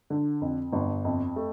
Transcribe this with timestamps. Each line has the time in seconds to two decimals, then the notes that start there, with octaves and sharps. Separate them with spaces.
0.10 D3
0.42 F2
0.72 G1
1.05 F2
1.36 A3